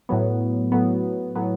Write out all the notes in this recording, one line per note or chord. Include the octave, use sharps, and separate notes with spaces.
A2 F#3 B3
A2 F#3 B3
A2 F#3 B3